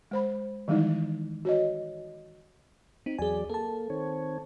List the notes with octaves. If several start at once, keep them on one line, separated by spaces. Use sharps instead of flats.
G#3 C5 B5
D#3 E3 G3 G#3 D#4 E4
F#4 C#5 D#5
C4 D#4
E2 F#3 G#4 D5 G#5
A#3 A4 A5
D#3 C4 C#5